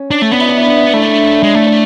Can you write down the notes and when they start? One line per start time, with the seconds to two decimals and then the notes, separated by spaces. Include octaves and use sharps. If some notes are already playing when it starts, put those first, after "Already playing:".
Already playing: C#4
0.11 D4
0.22 A3
0.31 B3 D4
0.40 E4
0.49 D4
0.58 E4
0.66 D4
0.76 E4
0.84 D4
0.94 A3 E4
1.02 D4
1.43 G#3
1.55 A3 E4
1.67 D4